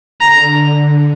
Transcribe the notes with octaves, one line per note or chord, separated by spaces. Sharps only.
D3 A#5